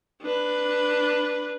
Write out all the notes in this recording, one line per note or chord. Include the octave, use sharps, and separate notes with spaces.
D4 B4